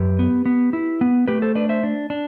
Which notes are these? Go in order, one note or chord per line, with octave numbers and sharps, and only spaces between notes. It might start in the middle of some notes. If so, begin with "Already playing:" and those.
Already playing: F#2 G4 B4
B3
B3
E4
B3
A3 G4 B4
A4 C5
D4 B4 D5
C5 E5
D4
D4